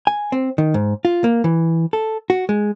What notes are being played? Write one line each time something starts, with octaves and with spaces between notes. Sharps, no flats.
G#5
C4
D#3
G#2
F4
A#3
E3
A4
F#4
G#3